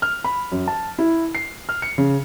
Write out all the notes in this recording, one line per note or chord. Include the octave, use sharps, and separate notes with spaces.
F6
B5
F#2
A5
E4
C7
F6
C#7
C#3